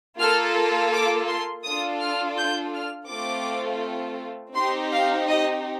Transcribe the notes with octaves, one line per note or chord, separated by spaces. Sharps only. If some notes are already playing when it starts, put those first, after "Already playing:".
A#3 F4 A4 F6
D6
C6
D4 F4 A4 D#6
F6
G6
F6
A3 C4 F4 A4 D6
C4 D#4 G4 C6
F5
D#5